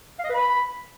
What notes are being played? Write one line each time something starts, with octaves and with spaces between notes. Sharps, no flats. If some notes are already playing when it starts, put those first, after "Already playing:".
F5
D#5
B4
B5